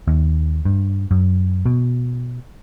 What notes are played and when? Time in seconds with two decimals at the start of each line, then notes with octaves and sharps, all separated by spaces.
0.08 D#2
0.65 G2
1.11 F#2
1.66 B2